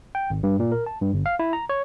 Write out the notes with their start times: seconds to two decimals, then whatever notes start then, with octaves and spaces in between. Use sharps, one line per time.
0.15 G5
0.30 G#1
0.43 G2
0.60 A#2
0.72 A#4
0.86 A5
1.02 G2
1.14 G1
1.26 F5
1.39 E4
1.53 A#5
1.69 C#5